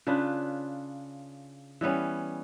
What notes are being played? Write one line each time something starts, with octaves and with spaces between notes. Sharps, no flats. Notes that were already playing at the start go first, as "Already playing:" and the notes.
C#3 D4 F4 B4
E3 G3 B3 C#4